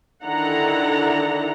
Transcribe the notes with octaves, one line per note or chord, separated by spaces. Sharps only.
D3 D#3 D4 E4 F#5 A#5